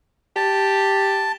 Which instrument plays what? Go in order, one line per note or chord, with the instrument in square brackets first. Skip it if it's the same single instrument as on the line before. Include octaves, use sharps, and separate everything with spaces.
[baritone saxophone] G4 [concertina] A5